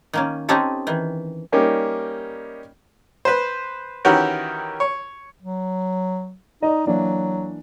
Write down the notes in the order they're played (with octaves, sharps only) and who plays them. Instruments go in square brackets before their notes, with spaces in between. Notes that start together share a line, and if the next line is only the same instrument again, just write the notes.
[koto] D#3 A#3 C#4
C4 C#4 D#4 G4 A4
D#3 E3
[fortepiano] G3 A#3 C#4 D#4 G4
B4 C5
D#3 E3 C#4 F#4 G4 A#4
C#5
[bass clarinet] F#3
[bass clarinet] D#4 [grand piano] D5 D#5
[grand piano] E3 A#3 D4 [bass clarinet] F#3